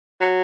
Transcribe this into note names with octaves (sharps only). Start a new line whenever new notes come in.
F#3